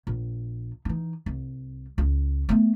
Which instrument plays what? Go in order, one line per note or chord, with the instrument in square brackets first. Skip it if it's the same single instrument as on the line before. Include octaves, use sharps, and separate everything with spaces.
[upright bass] A#1
E3 D#4
C2
C#2
A3 B3